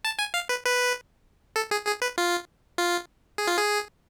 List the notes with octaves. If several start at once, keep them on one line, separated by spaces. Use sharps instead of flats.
A5
G#5
F5
B4
B4
A4
G#4
G#4
B4
F4
F4
G#4
F4
G#4